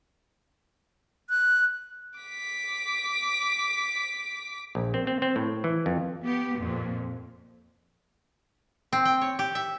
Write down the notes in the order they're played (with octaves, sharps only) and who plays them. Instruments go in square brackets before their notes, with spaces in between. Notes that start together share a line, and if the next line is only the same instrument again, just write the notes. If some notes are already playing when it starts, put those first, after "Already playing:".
[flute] F#6
[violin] D6 B6
[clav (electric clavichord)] A#1
C4
C4
C4
A2
E3
F2
[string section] B3 G4
F2 A#2
[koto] C4
G5
C#5
G4
E5